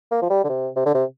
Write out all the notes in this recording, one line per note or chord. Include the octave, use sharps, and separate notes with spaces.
A#3
F3
G3
D3
C3
C3
D3
C3